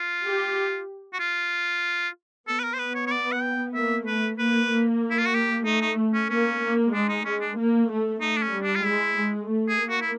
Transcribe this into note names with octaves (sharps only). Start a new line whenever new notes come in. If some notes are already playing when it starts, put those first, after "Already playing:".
Already playing: F4
G4
F#4
F4
B3 A4
B4
A#4
C5
B4
C#5
C#5
D5
F#5
G5
A#3 E5
A3 B4
A#3 B4
A#3
E4
F4
F#4
G4
A3 D#4
D#4
C#4
A#3 C#4
A#3
G#3 D4
D#4
G#3 C#4
D4
A#3
A3
A3 D#4
D4
C#4
G3
D4
F4
G#3 E4
G#3
A3
G#4
A#3
F#4
E4